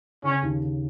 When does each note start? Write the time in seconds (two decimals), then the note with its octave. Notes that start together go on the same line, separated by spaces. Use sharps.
0.23 C#3 C#4
0.42 D#2
0.62 C#3